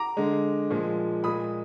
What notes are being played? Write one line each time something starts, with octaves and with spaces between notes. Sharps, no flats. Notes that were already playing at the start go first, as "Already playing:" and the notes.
Already playing: A#5 D6
D3 G#3
A#2 F3 G#3
A#2 G#3 B5 D#6